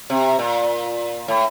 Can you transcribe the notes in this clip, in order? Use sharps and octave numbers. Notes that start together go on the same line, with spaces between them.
C3
A#2
A2